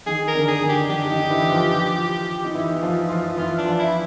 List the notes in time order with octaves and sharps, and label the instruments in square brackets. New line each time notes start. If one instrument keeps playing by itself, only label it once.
[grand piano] D#3 D#4 [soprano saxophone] G#4
[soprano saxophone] A#4
[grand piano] D3 D4
[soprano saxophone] G#4
[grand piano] D3 D4
[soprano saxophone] G4
[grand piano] D#4
[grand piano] D3 D4 [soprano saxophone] G4
[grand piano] D#3 D#4
E3 E4
F3 F4
D#4
E3 E4
F3 F4
F3 F4
[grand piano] E3 E4 [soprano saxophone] F4
[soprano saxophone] D4
[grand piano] F3 F4
[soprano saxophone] E4